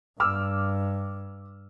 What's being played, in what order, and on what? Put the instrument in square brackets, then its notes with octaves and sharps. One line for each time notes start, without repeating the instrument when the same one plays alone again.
[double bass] G2 [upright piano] D6 E6 F6